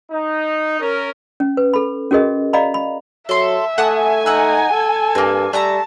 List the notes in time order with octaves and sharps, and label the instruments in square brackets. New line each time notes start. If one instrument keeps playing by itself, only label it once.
[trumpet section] D#4
C#4 A#4
[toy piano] C#4
B4
A4 B5
C#4 F#4 G#4 A#4 D#5
D5 D#5 F5 A#5 B5
B5
[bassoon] F#3 [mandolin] A4 C6 [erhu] E5
[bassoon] A3 [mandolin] F#5 A5 D#6 [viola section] G#5
[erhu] D#4 [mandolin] F#5 E6
[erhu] A4
[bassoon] G2 [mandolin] A#3 C4
[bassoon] G3 [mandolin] A3 E5 A#5 [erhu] A5